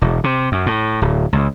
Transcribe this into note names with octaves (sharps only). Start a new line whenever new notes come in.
E1
C3
F#2
A2
D1
C#2